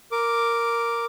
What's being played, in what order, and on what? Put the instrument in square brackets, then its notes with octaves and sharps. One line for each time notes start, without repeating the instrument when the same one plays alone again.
[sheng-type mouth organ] A#4 D6